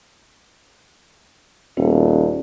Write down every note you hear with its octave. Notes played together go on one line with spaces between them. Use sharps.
D#1 B3 C#4 F#4